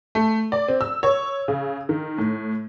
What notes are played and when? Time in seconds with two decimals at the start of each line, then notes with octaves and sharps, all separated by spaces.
0.15 A3
0.52 D5
0.68 C4
0.81 E6
1.03 C#5
1.48 C#3
1.89 D#3
2.18 A2